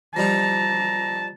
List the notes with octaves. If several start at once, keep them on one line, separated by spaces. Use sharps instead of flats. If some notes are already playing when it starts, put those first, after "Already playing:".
F3 G3 D#4 A5 A#5